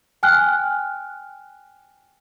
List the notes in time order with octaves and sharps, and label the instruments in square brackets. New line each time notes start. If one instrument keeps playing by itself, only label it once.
[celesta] G5 G#5 F6 F#6